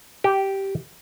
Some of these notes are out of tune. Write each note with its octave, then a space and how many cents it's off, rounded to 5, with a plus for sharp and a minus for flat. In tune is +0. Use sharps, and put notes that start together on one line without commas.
G4 -10